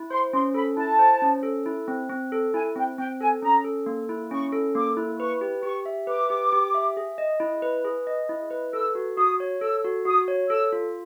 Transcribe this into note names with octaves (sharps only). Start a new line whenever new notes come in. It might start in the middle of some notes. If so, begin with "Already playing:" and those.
Already playing: E4
C5 C6
C#4 C6
A4 B5
E4 A5
C5
C#4
A4
E4
C4
C4
A4
E4 G#5
C4 G5
C4 G5
A4 G#5
C#4 A#5
A4
A#3
E4
C#4 C#6
A4
A#3 D6
E4
B4 C#6
G4
G4 C#6
E5
B4 D6
G4
G4
E5
G#4
D#5
E4
B4
G#4
D#5
E4
B4
A4 E6
F#4
F#4 D#6
C#5
A4 E6
F#4
F#4 D#6
C#5
A4 E6
F4